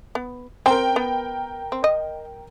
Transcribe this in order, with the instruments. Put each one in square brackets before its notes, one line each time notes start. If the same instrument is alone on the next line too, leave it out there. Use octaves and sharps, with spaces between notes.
[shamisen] B3
[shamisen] C4 [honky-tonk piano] A#4 G5
[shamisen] B3
C4
D#5